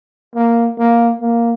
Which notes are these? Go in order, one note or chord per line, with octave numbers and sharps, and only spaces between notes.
A#3
A#3
A#3